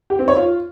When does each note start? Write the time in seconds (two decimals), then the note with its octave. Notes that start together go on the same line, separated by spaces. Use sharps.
0.10 G4
0.19 C4
0.28 C#5
0.37 F4